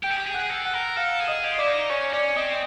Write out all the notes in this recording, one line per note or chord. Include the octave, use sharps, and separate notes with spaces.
G4 G5 G6
G#4
G4
G#4
F#5 F#6
G#4
A4
F#5 F#6
A#4
A4 F5 F6
G#4
D#5 D#6
G4
F4
E4 D5 D6
D#4
C#4 C#5 C#6
C#4 D5 D6
C4 D#5 D#6